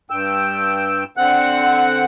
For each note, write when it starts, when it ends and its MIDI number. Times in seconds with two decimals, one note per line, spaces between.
0.10 1.04 43
0.10 1.04 79
0.10 1.04 88
1.17 2.05 50
1.17 2.05 60
1.17 2.05 78
1.17 2.05 90